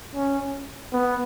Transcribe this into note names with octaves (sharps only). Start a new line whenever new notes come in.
C#4
B3